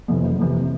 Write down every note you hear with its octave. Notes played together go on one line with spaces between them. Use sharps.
F2 C3 E3
F#1
F2 C3 E3